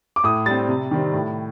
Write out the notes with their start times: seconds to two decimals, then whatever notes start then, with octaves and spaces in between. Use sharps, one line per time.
0.16 D6
0.24 A2 D#6
0.46 G3 C4 A6
0.69 C3
0.91 D#3 G3 C4
1.13 A2